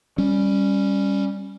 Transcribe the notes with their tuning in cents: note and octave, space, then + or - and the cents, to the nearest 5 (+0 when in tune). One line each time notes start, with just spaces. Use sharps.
G3 +10 C#4 +0